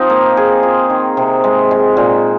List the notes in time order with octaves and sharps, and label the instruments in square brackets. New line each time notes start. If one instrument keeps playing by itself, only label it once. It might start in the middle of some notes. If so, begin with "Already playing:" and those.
Already playing: [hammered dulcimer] F3 C4 D#4
A#3
G#4
F4
D#3
C3
G#3
G#3
A#2